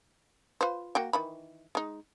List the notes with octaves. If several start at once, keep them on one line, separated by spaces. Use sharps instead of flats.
F4 B4 C5
A#3 F#4 G5
D#3 E3 B5
G#3 D#4